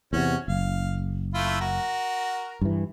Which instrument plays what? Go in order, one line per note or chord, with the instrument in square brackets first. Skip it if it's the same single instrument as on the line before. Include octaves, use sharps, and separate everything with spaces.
[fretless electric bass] E2 C3 [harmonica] C#4 F#4
[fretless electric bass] F#1 [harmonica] F5
[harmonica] A3 E4 F4
F#4 A#4
[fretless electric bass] G2 E3